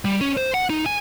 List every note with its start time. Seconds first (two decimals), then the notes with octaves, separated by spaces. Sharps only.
0.05 G3
0.21 C#4
0.37 C5
0.54 F#5
0.70 D#4
0.86 G#5